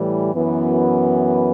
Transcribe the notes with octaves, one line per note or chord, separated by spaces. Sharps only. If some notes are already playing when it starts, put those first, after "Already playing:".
Already playing: A2 E3 G3
F#2 E3 B3